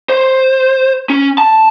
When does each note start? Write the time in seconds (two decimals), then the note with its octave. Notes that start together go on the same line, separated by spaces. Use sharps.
0.09 C5
1.10 C#4
1.38 A5